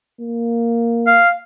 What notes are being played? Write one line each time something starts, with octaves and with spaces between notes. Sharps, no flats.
A#3
F5